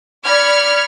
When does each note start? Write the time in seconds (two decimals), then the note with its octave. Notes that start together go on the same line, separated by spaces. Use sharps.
0.23 D5 B5 F6 G#6 C#7